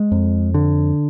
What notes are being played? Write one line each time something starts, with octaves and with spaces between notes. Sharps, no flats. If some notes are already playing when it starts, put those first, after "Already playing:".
Already playing: G#3
F2
D3